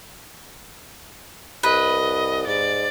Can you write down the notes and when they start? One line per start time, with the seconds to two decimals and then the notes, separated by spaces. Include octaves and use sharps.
1.63 C2 B4 D#5
2.47 G#2 D5